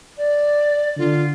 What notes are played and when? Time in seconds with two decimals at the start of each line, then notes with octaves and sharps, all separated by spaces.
0.17 D5
0.97 D3 F4